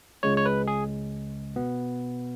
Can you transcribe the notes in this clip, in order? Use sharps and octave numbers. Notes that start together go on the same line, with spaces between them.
C#2 C#3 G#3 C#5
C#5
B4
G#4
B2 B3